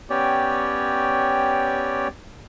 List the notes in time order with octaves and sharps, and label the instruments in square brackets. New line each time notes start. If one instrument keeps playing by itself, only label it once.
[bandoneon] B3 C#4 G4 C#5 D5 G5